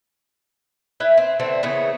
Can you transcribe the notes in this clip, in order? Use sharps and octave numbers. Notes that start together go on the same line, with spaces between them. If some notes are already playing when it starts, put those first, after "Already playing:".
E4 B4 E5 G5
C4
D3 E3 A3 C4
C#3 E3 A3 B3